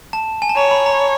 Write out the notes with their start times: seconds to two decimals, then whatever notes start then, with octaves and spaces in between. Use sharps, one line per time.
0.13 A5
0.42 G#5
0.49 A5
0.57 C#5 A#5
0.71 B5
0.86 A#5